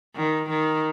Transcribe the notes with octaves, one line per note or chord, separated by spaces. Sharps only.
D#3
D#3